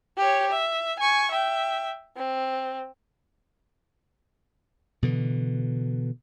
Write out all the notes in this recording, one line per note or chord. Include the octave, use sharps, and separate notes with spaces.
G4 C#5
E5
G#5 C#6
E5 G5
C4
B2 D3 E3